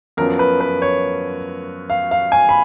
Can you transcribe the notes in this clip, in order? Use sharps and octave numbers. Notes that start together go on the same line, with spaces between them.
F#2 F3 B3 A#4
B4
B4
C#5
F5
F5
G#5
B5